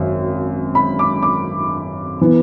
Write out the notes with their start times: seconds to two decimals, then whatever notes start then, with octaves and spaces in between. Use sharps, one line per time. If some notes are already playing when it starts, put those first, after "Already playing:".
Already playing: G#1 F#2
0.75 B5
0.99 D6
1.23 D6
2.21 E3 B3